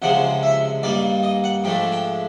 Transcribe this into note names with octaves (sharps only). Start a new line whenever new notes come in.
C#2 C3 F3 G#3 C4 F#5
E5
G2 D#3 G3 A#3 D5
D#5
F#5
G#2 F3 A3 D4 G5
G5